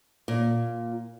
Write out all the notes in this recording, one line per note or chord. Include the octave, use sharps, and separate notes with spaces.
A#2